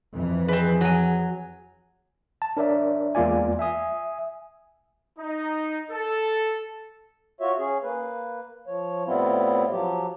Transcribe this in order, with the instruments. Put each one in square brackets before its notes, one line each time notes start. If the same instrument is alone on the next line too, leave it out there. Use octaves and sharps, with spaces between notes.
[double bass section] F2 E3
[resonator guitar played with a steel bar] C4 B4 [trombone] G#4
[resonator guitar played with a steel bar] F#3 G#5
[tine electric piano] A5
D4 A#4 C#5 D5 E5
E2 G#3 A#3 F4 D5 G#5
E5 G#5 D#6
[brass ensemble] D#4
A4
[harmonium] F4 F#4 C#5 E5
C#4 G#4
A#3 B4
F3 C#5
A2 G3 B3 C4 E4 F4
F3 F#3 G4